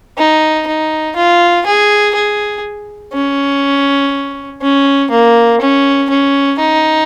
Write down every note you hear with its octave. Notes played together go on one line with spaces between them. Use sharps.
D#4
D#4
F4
G#4
G#4
C#4
C#4
A#3
C#4
C#4
D#4